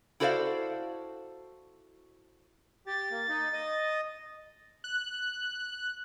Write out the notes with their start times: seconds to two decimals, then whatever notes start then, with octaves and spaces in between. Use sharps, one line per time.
0.20 E4 F#4 A4 C5 D5 F5
2.87 G4 A6
3.11 A#3
3.29 D#4
3.53 D#5
4.84 F#6